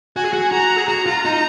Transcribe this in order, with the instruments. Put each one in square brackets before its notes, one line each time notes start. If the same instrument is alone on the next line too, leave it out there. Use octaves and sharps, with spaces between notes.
[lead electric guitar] F#4 [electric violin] G#5
[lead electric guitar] G#4
F#4
[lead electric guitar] F#4 [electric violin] A#5
[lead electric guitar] G#4
[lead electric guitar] F#4 [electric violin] A#5
[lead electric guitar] F4
D#4